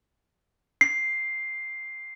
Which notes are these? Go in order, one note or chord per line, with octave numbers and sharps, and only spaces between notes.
C7